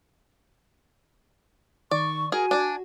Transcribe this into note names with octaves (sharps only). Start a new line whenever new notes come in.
D#3 D5 C#6
F#4 G#4 A#4 G#5
D4 D5